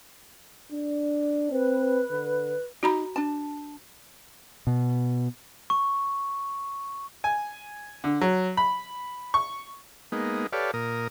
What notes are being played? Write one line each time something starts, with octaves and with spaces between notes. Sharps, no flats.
D4
C4 B4
D3
D#4 F#4 A#5 B5
D4 A5
B2
C#6
G#5
D3
F#3
B5
C#6
G#3 A#3 B3 D#4
G4 A4 B4 C#5 D5 F5
A#2 A#4 D#6